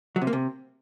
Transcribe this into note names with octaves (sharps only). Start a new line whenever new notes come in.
F#3
C3
A#3
C3